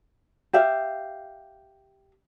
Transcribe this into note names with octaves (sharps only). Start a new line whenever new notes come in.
G4 E5 F5